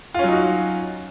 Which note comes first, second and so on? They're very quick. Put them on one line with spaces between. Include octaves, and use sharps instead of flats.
F4 C#4 F#3 D#4 F#4